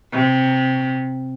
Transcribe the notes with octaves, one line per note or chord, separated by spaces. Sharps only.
C3